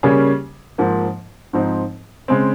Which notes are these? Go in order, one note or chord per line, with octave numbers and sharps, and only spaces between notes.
C#3 G3 A#3 C#4 G#4
G#2 F3 A#3
G#2 F3 C4 D#4
C#3 G#3 C4